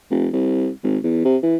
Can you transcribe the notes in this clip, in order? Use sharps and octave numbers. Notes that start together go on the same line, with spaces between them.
F1
C2
G#1
E2
C3
E3